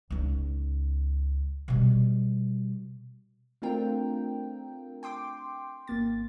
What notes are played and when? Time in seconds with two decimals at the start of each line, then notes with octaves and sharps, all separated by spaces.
0.10 C#2 D#4
1.68 B2 G3
3.62 A3 C4 D4 F4 A#4 G5
5.03 G5 C6 D6
5.87 G#1 A#3 A6